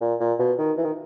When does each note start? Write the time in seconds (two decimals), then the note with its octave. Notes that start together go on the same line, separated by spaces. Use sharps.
0.01 A#2
0.20 A#2
0.39 B2
0.58 D#3
0.77 E3
0.84 D#3